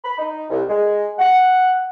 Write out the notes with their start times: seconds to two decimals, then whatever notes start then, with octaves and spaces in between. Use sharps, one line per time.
0.04 B5
0.18 D#4
0.50 C2
0.69 G#3
1.19 F#5